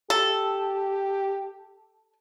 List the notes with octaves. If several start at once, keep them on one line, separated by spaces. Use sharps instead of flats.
G4 A4